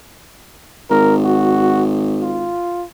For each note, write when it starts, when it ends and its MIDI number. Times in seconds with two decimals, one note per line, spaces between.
0.90 2.59 32
0.90 1.16 70
1.25 1.84 66
2.21 2.85 65